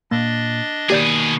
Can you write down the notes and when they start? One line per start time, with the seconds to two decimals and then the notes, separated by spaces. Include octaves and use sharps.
0.11 A#2 A#3 D4 D#5 A6
0.90 B2 D#3 A#3 G4 G#4 D5 G6